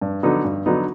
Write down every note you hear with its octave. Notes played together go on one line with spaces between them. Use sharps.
G2
D3 F#3 B3 D#4
G2
D3 F#3 B3 D#4